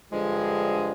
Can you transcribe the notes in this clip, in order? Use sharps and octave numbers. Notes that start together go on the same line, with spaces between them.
G2 D3 F3 G#3